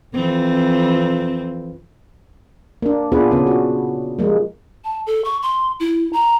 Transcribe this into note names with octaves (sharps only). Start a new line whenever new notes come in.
F2 E3 C4
A#3 D4
A#2 B3 D4 F4 G#4 B4
C#3 B3 C#4
F#4
F3 G3 G#3 A#3
A5
A4
C#6
C6
E4
A#5